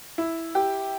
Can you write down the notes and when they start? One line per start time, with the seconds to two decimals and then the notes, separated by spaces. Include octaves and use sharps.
0.18 E4
0.55 G4